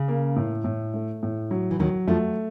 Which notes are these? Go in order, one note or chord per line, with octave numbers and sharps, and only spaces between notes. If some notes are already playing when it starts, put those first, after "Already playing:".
Already playing: C#3
A#3
A2
A2
A3
A2
F#3
E3
D#2 D#3 F#3
F2 F3 A3